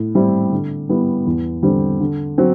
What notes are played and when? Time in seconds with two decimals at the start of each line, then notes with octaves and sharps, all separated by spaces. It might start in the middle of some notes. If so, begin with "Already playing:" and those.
Already playing: A2
0.15 G3 C4 E4
0.51 D3
0.89 G3 B3 E4
1.26 E2
1.62 D3 G3 C4
2.00 D3
2.38 F#3 C4